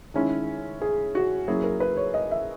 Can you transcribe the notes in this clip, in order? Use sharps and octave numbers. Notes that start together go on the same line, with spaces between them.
D#3 G#3 C#4 E4
G#4
F#4
F#3 A#3 C#4 E4 G#4
A#4
B4
C#5
D#5
E5